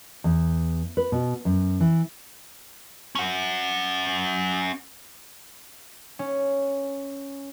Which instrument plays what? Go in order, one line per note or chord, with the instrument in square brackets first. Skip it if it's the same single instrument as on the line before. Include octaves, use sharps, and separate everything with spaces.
[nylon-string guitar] E2
B4
B2
F#2
E3
[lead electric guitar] C#4 F#5
[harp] C#4